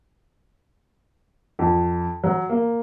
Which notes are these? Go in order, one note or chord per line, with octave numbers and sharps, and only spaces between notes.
F2
F#3
A#3